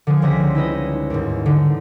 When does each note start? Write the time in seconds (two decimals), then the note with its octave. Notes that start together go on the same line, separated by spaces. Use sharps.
0.07 D3 F3 G#4
0.22 C#2 G3 C5 D#5 B6
0.55 D#4 E4 B4 D#5
1.10 D#2 G#2
1.46 D3 D#4